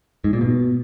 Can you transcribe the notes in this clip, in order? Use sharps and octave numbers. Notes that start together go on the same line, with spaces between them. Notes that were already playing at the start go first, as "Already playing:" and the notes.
G#2
A#2
B2